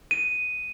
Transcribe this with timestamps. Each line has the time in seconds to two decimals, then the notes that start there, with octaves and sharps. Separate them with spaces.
0.11 D#7